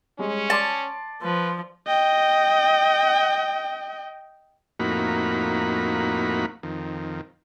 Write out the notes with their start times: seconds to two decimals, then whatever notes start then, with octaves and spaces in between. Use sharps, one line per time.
0.19 G3 G#3 C#4
0.50 D5 A5 C6 D6
1.23 F3 B4
1.87 D#5 G5
4.80 F2 A2 A#3 D#4 F#4 B5
6.63 F2 D#3